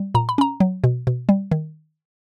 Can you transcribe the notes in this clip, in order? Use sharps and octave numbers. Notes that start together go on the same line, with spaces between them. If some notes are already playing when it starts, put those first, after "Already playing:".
Already playing: G3
A#2 A#5
B5
C#4 A#5
F#3
B2
B2
G3
D#3